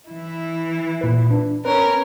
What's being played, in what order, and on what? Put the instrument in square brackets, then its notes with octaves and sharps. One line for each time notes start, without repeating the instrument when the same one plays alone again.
[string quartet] E3 E4
[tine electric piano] A#2 B4
D4
[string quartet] C#4 A#4 C#5 [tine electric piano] B4